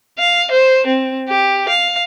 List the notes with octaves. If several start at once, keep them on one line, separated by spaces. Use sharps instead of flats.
F5
C5
C4
G4
F5